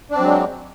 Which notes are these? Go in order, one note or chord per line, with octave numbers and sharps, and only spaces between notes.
F#3 G#3 C4 D4